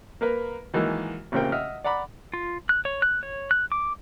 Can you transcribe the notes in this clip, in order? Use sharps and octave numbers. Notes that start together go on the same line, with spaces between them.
A#3 A#4 B4
D#3 E3 F#3 G#3 A#3
A1 A#2 C#3 C4 A#4 G5
D#5 E5 F#5 F6
D5 F#5 A#5 B5 D6
F4
F#6
C#5
F#6
C#5
F#6
D6